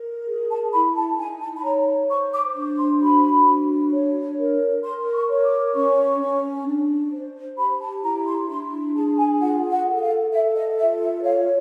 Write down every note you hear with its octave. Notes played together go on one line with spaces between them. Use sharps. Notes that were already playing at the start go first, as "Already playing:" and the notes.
Already playing: A#4
G#4
A5
E4 B5
A5
D#4 G#5
A5
B5
C#5 A#5
C5 C#6
D6
D4
C6
F#4 B5
D4
C#5
A#4
A#4 C6
C#6
C#5
D6
C#4 C#6
C#4
D4
C5
G4 B5
A5
E4 A#5
C6
D4 C6
G#4 A5
G#5
F4 F#5
F#5
A4
F#5
F5
A4 E5
D#5
F4 E5
E5
C#5 F5